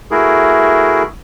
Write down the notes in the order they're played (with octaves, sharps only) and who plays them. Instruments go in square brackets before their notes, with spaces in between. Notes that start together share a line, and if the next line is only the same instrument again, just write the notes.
[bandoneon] A3 E4 F#4 G#4 A#4